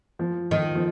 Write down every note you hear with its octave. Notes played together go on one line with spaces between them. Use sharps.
F3
D#3 F3
F3